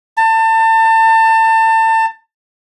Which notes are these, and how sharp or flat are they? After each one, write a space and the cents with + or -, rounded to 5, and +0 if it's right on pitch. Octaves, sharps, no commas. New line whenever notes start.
A5 +30